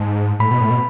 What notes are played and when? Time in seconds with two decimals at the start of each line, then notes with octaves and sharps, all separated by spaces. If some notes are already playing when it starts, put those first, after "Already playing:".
Already playing: G#2 A5
0.39 A2 B5
0.51 B2
0.61 A2
0.70 B2